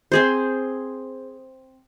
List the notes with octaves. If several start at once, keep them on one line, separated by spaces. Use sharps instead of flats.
C4 G#4 C5